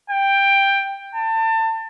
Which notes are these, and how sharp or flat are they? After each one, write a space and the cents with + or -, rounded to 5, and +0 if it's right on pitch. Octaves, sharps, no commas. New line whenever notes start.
G5 +10
A5 +30